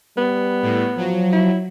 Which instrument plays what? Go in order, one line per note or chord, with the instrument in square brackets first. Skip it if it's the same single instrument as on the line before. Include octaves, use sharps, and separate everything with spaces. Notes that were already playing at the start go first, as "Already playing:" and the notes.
[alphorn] G3 [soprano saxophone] B3
[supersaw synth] A2
[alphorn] F3 [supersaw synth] F#3
[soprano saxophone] E4